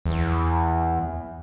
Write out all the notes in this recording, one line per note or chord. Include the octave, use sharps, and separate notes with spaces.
E2